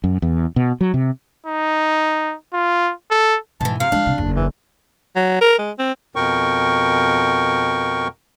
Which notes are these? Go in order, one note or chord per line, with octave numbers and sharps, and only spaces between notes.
F#2
E2
B2
F#3
C3
D#4
F4
A4
G#2 B2 E3 A5
C3 F5
F3 G#3 D4
C3
F#1 E2
E3
F#3
A#4
G#3
C4
F2 B2 A#4 G5 C#6